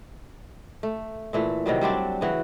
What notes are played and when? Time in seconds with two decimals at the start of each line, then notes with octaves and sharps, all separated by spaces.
0.83 A3
1.33 A#2 E3 A3
1.66 C3 D#3 F#3 G3
1.81 F#3 G3 C4 D4
2.21 C#3 E3 F#4